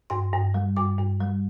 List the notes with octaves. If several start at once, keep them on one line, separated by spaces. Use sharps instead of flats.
G2 C6
G2
G3
G2 D6
G2
G3